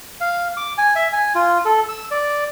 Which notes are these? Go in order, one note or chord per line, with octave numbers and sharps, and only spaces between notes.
F5
D6
G#5
E5
G#5
F4
A4
E6
D5